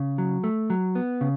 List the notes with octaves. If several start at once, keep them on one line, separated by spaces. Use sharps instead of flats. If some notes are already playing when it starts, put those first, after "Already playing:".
Already playing: C#3
F#3
A3
F#3
B3
C#3